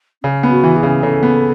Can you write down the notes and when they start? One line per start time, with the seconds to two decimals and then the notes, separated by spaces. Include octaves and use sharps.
0.23 C#3 C#4
0.43 B3
0.50 F#4
0.64 E3
0.76 G#4
0.83 C#3
1.03 C#3 A4
1.23 B3